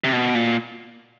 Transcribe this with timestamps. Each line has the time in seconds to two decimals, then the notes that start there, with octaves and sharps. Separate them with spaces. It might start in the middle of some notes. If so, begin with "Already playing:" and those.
0.04 C3
0.13 B2
0.35 A#2